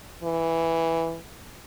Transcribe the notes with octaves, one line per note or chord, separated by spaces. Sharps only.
E3